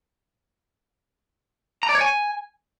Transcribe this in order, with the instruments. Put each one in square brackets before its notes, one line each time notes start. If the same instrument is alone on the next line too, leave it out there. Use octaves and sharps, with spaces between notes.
[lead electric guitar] A#5
D5
C#5
G#5